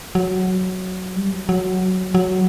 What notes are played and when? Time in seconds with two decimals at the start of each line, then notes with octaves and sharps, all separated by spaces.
0.15 F#3
1.16 G3
1.32 F#3
1.49 F#3
2.15 F#3